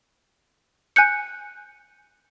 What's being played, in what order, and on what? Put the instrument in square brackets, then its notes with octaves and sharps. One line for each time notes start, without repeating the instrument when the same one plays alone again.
[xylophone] G#5 F#6 G6 C#7